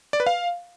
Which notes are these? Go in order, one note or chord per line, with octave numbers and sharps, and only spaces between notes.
D5
B4
F5